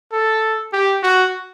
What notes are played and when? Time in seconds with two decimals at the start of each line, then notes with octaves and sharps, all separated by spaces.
0.13 A4
0.73 G4
1.03 F#4